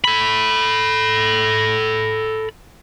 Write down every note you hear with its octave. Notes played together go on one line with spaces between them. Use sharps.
A4 B5